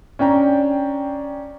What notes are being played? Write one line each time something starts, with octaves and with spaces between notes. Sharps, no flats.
C#4 D4 G5 A#5